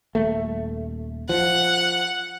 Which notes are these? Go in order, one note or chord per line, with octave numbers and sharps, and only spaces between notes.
D#1 A3
F3 F#5